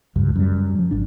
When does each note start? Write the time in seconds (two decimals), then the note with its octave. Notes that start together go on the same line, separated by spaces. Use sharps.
0.16 D1 C#2 G2
0.36 F#2 G3
0.79 F3
0.91 G#1 D4